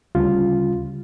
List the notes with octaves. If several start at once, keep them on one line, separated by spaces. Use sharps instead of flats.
D2 C#3 G3 F4